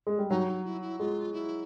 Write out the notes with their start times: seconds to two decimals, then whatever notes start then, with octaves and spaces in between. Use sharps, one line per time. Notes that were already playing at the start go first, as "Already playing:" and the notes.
0.07 G#3
0.18 G3
0.30 F#3 D#4
0.48 D#4
0.65 E4
0.81 E4
0.99 G#3 F4
1.33 E4